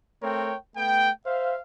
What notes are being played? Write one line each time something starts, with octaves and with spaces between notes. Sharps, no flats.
A3 C4 A#4 C#5 G5
A3 B3 G5
C5 E5 F5